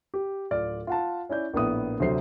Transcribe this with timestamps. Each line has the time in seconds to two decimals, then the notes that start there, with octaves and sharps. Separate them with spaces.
0.14 G4
0.51 D1 F4 D5 F6
0.87 F4 F#5 A5
1.30 C#4 E4 D5 G6
1.54 A#1 A2 A#3 B3 D#6
2.00 D2 C3 F#3 C5 C7